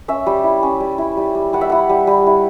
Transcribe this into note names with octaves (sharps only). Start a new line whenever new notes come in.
C#4 E5
G3
E4
C#4
G3
E4
G3
G3
G3 F#5
E5
E4 F#5
G3
G3
E4